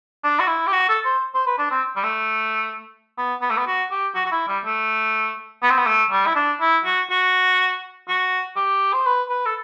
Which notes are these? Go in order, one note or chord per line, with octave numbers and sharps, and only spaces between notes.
D4
F#4
E4
G4
F#4
A4
C5
C5
B4
D4
C4
G3
A3
B3
B3
A3
B3
F#4
G4
F#4
F#4
E4
G3
A3
B3
C4
B3
A3
G3
E4
D4
E4
F#4
F#4
F#4
G4
C5
B4
B4
A4